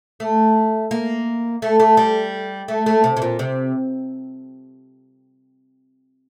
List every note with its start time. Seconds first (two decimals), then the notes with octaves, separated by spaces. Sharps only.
0.20 A3
0.91 A#3
1.62 A3
1.80 A3
1.97 G3
2.68 A3
2.86 A3
3.04 C3
3.17 C3
3.22 A#2
3.39 C3